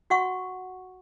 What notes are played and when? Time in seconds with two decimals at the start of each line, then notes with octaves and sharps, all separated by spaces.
0.10 F#4 F#5 C#6